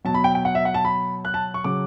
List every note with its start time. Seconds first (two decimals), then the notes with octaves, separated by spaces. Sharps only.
0.04 B2 F#3 A5
0.14 B5
0.24 G5
0.35 G5
0.45 F#5
0.55 E5
0.65 F#5
0.74 A5
0.85 B5
1.25 F#6
1.34 A5
1.54 C#6
1.64 C#3 F#3 D6